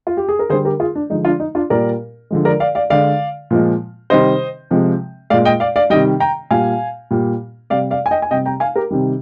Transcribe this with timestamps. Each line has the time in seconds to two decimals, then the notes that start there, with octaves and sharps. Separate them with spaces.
0.07 F4
0.17 G4
0.29 G#4
0.39 A#4
0.50 D3 G#4 C5
0.53 G3
0.65 G4 A#4
0.80 F4 G#4
0.95 D4
1.10 D3 F3 G#3 D#4
1.25 D4 F4
1.40 D#4
1.55 D4 F4
1.70 A#2 G3 A#4 D5
2.31 D3 F3 G#3
2.45 A#4 D5
2.60 D5 F5
2.75 D5 F5
2.90 D3 G#3 D5 F5
3.51 A#2 F3 G#3
4.10 C3 D#3 G3 C5 D#5
4.71 C3 F3 G#3
5.30 G#3 D5 F5
5.34 A#2
5.45 D#5 G5
5.60 D5 F5
5.76 D5 F5
5.90 C3 D#3 G3 D#5 G5
6.20 G5 A#5
6.51 A#2 G3 F5 G#5
7.11 A#2 G3
7.70 C3 G3 D5 F5
7.91 D5 F5
8.06 G#5
8.11 D#5 G5
8.22 G#5
8.31 C3 D#5 G5
8.34 G3
8.46 G5 A#5
8.60 F5 G#5
8.76 G4 A#4
8.91 C3 D#3 G3